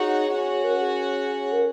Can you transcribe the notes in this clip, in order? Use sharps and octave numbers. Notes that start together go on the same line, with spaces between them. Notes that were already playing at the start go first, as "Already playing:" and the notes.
Already playing: D#4 F#4 G#4 C#5 F#5
C#4 F#4 C#5 F#5
A#4
G#4
A#4